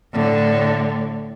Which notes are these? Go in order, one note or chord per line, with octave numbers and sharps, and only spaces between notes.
A2 D3